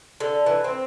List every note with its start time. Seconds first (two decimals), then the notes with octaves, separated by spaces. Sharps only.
0.20 D3
0.46 E3
0.64 C4